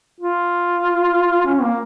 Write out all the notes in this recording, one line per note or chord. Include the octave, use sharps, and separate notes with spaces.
F4
C#4
A#3